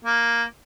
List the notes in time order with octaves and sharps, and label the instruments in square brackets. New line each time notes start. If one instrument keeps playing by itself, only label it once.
[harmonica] A#3